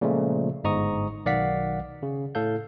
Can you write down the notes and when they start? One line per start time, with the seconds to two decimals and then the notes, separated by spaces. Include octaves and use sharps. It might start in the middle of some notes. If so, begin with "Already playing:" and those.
0.01 A#2 C#3 F3 G#3 A3
0.64 G1 G#2 D#5 A#5 C#6 D#6
1.25 B1 D#3 D5 F5 F#5 B6
2.03 C#3
2.35 A2 A4 F5 G6